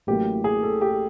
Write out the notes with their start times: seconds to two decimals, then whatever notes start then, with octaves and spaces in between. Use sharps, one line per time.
0.07 A1 A2 F#3 A#3 G4
0.44 G#4
0.63 A4
0.81 G4